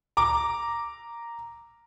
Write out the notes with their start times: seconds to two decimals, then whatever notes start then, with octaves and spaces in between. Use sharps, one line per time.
0.17 A#5 D6